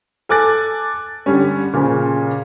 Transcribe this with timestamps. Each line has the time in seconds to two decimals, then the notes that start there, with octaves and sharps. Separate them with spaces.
0.29 A4 G#5 D6 F#6 A6
1.26 D3 G3 C#4
1.73 A#2 C#3 F3